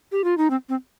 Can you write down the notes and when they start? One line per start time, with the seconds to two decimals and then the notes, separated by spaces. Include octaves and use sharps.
0.12 G4
0.24 F4
0.38 D#4
0.50 C4
0.69 C4